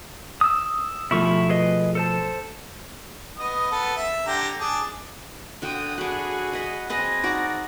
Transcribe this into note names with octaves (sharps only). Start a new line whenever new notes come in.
D#6 E6
B2 F3 A3 E4 C#6
G#4 B4 D#5
A4 C5 A5
B3 D#5
B3 A4
E5
D3 G4 A#5
D4 G#4
D3 F#4 G5 D#6
D4 F#4 G#4 B4
B4 D#5
C4 G#4 B4 D#5 A#6
D#4 F#4 D5